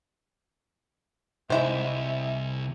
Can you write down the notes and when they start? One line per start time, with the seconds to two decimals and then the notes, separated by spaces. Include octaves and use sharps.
1.50 C2 G#3 E4 C5 E5